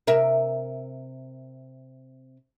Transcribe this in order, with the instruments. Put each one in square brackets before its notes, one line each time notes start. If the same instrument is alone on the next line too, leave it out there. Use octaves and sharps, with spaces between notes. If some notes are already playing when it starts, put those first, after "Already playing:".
[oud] C3 A#4 E5